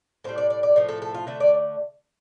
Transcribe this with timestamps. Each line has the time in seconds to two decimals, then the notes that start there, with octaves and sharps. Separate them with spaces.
0.24 A2 G3 C5
0.38 D5
0.50 D5
0.63 D5
0.76 A2 F3 A3
0.89 A4
1.02 A4
1.14 F4
1.27 D3 A3 E5
1.40 D5